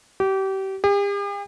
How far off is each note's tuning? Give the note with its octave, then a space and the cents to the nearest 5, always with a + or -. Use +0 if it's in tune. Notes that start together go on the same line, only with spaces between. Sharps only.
G4 -30
G4 +45